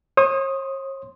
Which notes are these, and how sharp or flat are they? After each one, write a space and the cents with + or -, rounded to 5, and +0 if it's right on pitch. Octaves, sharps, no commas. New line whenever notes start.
C#5 -45 C6 +0 D#6 +0